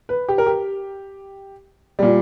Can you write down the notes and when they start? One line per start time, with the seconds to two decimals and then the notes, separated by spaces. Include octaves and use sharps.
0.09 B4
0.28 G4
0.38 A#4
0.46 G4
1.99 A#2 G3